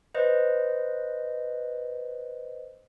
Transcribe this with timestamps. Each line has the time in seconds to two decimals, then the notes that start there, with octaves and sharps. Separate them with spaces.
0.15 B4 C5 D#5